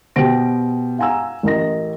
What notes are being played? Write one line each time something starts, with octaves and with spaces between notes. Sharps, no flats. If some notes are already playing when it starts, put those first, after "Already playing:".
B2 G4 C5 G5 A#6 D7
F5 F#5 G#5 A#5 E6
A1 A#4 D#5 A#6